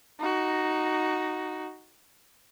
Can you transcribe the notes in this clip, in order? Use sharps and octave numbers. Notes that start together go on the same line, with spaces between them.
D#4 F#4